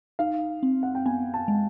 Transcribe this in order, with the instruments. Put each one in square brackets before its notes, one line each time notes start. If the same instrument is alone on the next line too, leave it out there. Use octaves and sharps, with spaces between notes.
[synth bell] D#4 [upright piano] F5
[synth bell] C4
[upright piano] F#5
G5
[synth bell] B3 [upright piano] G#5
[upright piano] A5
[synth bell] G#3